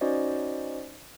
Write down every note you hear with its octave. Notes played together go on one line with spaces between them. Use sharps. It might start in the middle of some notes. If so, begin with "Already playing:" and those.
C#4 D#4 F#4 C5 D5 D#5